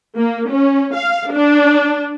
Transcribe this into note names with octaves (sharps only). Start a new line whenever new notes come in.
A#3
C#4
F5
D4